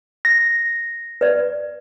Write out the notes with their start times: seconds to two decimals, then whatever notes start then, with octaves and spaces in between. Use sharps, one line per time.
0.25 A#6
1.21 B4 D5